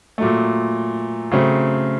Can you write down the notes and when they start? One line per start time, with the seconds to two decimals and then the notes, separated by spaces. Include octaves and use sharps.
0.18 A#2 F#3 A3
1.31 C#3 F#3 A3 C4